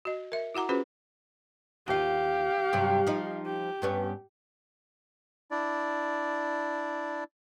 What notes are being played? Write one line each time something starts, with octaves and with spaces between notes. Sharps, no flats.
F#4 D#5
A#4 E5
E4 F#4 F#5 A#5 D6
C#4 F4 F#4 G#4 B4 C5
D#2 F4 G4 F5
G2 C3 F#3
F3 D#4
G4
G2 B3 C#4
D4 E4 D5